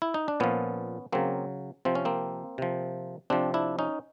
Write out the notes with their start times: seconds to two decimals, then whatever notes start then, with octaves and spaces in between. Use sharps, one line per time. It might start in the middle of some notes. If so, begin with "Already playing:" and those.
0.02 E4
0.14 D#4
0.28 D4
0.40 A#2 F3 B3 C#4
1.12 C#3 F#3 A#3 C4
1.85 C3 F3 C4
1.95 C#4
2.05 A#3 C4
2.58 C3 F3
3.30 C3 F3 C4 D4
3.54 D4 E4
3.79 C#4 D#4